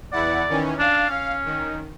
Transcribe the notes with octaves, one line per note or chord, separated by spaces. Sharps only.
E2 E4 D5 F#5
D#3 E3 C#4
D4 F5
C#4
D#3